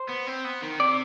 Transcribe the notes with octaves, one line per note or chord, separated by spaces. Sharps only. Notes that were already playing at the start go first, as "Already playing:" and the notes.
Already playing: C5
B3
C4
B3
D#3
C3 D5